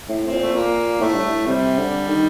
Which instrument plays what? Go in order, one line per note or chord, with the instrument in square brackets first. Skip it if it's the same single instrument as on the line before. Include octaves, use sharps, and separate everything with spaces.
[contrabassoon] A2
[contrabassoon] A2 [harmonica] C4
[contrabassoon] A#2
[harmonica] A3
[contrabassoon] A#2 [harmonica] A#3
[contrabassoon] A2 [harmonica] A3
[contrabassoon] G2
A2
[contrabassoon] C3 [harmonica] G3
[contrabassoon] D3
D#3